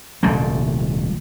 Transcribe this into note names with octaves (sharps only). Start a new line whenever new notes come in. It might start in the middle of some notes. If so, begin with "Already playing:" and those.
D#1 C2 A#2 A3